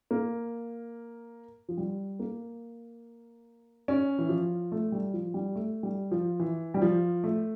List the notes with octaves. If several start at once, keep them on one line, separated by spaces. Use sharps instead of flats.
A#3
F3
G3
A#3
C#4
E3
F3
A3
G3
F3
G3
A3
G3
F3
E3
G3
F3
A3